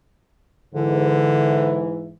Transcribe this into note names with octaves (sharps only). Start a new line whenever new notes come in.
G#2 D3 E3